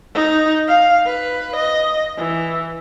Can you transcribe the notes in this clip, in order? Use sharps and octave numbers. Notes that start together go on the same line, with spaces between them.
D#4
F5
B4
D#5
E3